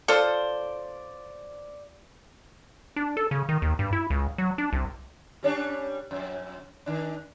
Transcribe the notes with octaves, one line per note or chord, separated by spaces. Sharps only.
F4 A4 C5 D5
D4
A4
C#3
D#3
D#2
G2
E4
C#2
F#3
D4
C2
G3 C#4 D4
F2
D#3 D4